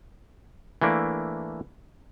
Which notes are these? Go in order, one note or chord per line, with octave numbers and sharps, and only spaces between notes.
E3 A3 A#3 D4